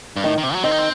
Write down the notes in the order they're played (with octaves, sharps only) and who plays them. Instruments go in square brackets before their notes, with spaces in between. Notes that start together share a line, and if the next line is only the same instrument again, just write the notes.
[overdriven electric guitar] G2
[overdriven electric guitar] A2 [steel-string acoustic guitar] D#3
[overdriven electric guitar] D#3
C3
F#3
[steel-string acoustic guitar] D#3 [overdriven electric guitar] C4
[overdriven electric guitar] D#4
C4